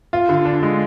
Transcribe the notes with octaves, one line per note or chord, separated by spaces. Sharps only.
F4
D3
D4
G#3